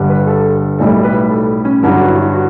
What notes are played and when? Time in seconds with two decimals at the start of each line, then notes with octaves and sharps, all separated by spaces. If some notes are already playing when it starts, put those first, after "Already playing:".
Already playing: G1 G2 D3
0.09 B4
0.27 A4
0.78 B1 A2 G3 A4
1.04 B4
1.30 A4
1.65 C#4
1.82 G1 G2 F#3 E4
1.96 F#4
2.09 E4
2.21 E4
2.33 F#4